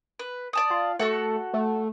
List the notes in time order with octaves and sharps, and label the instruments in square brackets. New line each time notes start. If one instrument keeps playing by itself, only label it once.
[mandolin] B4
D5 A5 D#6
[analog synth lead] F4
[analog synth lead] A3 [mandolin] F#4 A4 F#5
[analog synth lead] A3